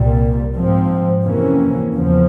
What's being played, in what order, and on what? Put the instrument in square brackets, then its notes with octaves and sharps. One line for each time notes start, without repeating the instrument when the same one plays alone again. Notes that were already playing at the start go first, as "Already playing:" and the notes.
Already playing: [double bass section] C2 A#2 G3
G#2 F3 C4
F2 C3 E3 A#3 C#4
E2 C#3 F3